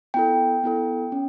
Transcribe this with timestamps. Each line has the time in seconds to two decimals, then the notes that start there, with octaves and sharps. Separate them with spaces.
0.14 B3 E4 A4 G5
0.64 B3 E4 A4
1.12 C#4